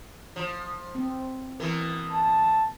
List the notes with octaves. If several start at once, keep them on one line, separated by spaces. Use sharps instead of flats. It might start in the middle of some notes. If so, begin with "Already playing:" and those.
F3
C4
B2 E3 A#4
A5